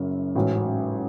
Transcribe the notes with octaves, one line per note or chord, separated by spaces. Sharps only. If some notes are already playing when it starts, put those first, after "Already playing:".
Already playing: F#1 F#2
A1 G#2 F#3 C#4